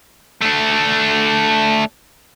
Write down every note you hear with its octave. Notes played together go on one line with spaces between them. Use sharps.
A3 D4